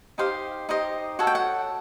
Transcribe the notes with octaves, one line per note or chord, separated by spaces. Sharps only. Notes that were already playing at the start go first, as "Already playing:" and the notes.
D#4 G4 C5 F5
D#4 G4 C5 D#5
F#4 A4 C#5 F#5
G5
F#5